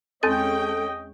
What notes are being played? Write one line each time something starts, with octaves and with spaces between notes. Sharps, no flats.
E2 G#3 C4 C#4 A4 D#5 G5 A6